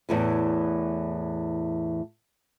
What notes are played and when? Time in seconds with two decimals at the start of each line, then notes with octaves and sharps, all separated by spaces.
0.09 E2 A2 E3